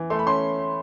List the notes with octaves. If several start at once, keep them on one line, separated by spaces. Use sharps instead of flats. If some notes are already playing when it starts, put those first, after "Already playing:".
Already playing: E3
A3 C6
B5
C#4 C6